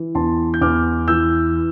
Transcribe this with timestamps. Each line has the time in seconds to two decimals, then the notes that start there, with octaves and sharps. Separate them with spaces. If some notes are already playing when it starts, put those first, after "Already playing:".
Already playing: E3
0.15 E2 A5 C6
0.54 G6
0.61 E2 D6 F6
1.08 E3 E6 G6